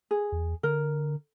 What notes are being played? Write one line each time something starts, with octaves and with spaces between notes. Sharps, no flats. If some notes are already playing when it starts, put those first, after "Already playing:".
G#4
E2
D3 A#4